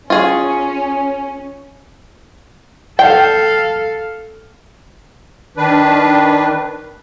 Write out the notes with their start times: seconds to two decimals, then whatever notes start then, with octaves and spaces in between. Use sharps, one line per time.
0.10 C#4 F4 G#4
2.99 A4 F5 G5
5.57 D#3 D4 B4